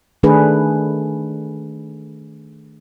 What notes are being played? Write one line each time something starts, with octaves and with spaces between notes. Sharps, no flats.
D#3 A3 D4 G#4 B4